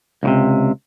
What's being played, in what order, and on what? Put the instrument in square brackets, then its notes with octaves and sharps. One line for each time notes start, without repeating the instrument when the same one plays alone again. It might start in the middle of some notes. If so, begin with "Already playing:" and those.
[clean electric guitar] C#2 A2 C3